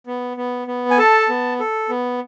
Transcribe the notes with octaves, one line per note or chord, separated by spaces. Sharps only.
B3
B3
B3
G#5
A4 A5
B3
A4
B3